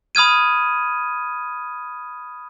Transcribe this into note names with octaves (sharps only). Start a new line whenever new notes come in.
B5 D#6 F6 G#6 D#7